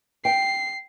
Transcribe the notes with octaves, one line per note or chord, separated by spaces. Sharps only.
G5 C7